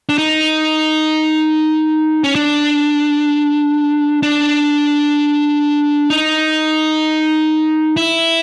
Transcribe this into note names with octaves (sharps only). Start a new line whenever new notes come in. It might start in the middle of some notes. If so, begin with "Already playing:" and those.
D4
D#4
C#4
D4
D4
D#4
E4